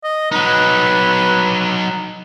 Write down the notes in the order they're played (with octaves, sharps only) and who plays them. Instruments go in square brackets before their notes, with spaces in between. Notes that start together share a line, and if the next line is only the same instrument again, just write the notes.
[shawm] D#5
[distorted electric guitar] F#3 D#4 [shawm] B4